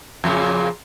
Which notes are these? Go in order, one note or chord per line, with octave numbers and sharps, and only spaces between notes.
F2 A#2 C#3